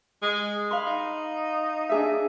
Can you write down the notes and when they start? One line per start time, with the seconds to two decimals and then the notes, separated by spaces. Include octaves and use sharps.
0.22 G#3
0.71 F5 B5 C6
0.87 D#4
1.89 D4 G#4 E5